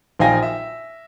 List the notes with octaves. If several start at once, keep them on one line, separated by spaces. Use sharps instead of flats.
A#1 D#4 F5 G5 G#5 A#6
E5